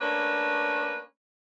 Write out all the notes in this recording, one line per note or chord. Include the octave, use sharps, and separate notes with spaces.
A3 A#3 C#4 D4 B4